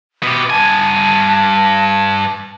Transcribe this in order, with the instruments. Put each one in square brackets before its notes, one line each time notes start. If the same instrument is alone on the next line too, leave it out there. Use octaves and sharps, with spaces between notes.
[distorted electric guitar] B2 G4
[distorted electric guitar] G2 G#5 [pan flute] A5